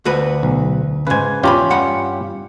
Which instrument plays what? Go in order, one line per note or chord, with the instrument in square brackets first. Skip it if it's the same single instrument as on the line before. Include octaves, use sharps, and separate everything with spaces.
[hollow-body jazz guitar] D2 F#4 B4
[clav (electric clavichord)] B1
[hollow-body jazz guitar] G#2 C#3 [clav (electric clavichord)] B4 G#5
[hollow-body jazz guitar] E2 A#5 B5 [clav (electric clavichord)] C#4 F4 G4
[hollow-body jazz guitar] G2 F#5 B5